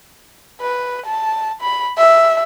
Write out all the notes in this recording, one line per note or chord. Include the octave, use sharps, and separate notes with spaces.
B4
A5
B5
E5